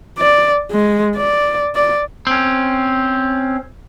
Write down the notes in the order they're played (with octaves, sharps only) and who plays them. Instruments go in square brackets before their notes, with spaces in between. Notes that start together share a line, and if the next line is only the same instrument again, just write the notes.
[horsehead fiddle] D5
G#3
D5
D5
[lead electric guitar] C4 C#4